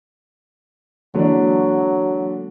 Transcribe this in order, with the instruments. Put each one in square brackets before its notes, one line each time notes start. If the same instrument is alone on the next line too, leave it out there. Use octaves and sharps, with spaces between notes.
[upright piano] D3 D4 [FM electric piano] E3 G#3 A#3 [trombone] F#3